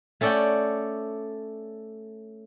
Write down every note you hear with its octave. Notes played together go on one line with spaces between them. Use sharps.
A3 C#4 A4 D5 F#5 G5